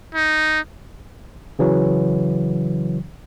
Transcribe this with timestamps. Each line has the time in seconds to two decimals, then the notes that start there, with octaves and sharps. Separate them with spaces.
0.15 D#4
1.59 C#3 E3 F#3